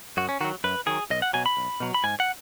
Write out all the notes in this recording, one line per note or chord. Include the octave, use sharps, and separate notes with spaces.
F#2 F#4
C#4
D#3 F#3 F#4
F#2 B4
D#3 F#3 G#4
B1 D#5
F#5
B2 F#3 G#5
B5
B1
B2 F#3
B5
G#2 G#5
F#5